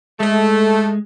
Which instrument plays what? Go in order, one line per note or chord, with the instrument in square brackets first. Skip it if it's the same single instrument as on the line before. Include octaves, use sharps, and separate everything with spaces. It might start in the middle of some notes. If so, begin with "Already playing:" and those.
[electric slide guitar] G#3 [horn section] A3